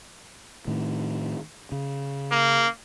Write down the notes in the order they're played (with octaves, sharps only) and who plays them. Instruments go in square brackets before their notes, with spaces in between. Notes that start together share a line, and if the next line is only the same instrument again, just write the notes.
[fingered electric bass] A2 D#3
C#3
[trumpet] A#3